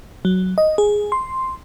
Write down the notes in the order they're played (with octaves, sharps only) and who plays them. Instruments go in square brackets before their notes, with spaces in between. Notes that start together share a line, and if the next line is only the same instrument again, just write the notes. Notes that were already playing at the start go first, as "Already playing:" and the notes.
[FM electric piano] F#3
D#5
G#4
C6